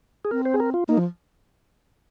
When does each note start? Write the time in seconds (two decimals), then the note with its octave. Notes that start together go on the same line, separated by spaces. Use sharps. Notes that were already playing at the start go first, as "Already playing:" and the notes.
0.25 G#4
0.31 C4 A#4
0.45 C5
0.54 G#4
0.60 A#4
0.74 F4
0.88 A#3 D#4
0.98 F3